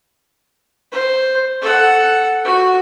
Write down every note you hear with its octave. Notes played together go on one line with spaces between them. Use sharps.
C5
A4 F#5
F#4